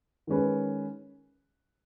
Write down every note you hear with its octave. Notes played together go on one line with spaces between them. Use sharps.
D#3 G#3 C#4 B4